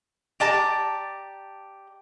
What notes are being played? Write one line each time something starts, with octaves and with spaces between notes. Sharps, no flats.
G4 D5 A5 A#5